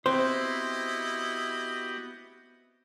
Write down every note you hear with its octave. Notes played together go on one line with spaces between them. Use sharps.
B3 C4 E4 F#4 G4 C5 D#5